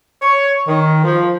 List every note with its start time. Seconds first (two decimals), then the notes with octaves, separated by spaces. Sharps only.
0.22 C#5
0.68 D#3
1.04 F3